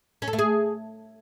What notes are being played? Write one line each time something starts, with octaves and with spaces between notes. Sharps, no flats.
C#4
A4
A3
G#4